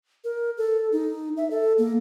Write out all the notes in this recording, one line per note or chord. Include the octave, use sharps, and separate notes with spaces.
A#4
A4
D#4
E5
A4
A#3